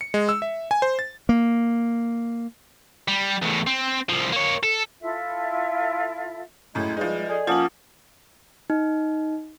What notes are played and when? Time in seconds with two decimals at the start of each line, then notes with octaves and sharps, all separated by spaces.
0.01 C#7
0.14 G#3
0.29 E6
0.42 E5
0.71 G#5
0.82 C5
0.99 A6
1.29 A#3
3.08 G3
3.42 E2 A2
3.67 C4
4.09 C2 F3
4.33 A#3 C#5
4.63 A4
5.01 E4 F4 A4 E5
6.75 F#2 A2 G#3 E4
6.97 E3 F3 G3 G#3 D#4 G#4
7.28 G#4 A4 D5 D#5
7.47 F3 A#3 C#4 F4 F#5 A5 D#6 F#7
8.70 D#4